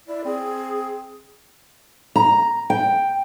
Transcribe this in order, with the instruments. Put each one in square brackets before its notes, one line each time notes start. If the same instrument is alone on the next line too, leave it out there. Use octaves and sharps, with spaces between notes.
[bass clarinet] E4 [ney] D5
[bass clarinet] C4 [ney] G#4
[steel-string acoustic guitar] A#5
G5